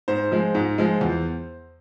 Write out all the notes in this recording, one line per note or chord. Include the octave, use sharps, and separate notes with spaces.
G#2 C5
F3 G#3
G#2
F3 G#3
E2